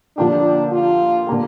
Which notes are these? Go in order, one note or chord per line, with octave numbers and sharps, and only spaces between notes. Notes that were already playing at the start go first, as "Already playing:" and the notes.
D3 F3 A#3 D4 G4
F4
D3 A#3 G4